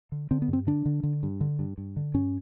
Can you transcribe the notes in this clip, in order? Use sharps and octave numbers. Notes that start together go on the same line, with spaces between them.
D3
D3 C4
B3
G2 C4
D3 D4
D3
D3
G2
D3
G2
G2
D3
G2 C#4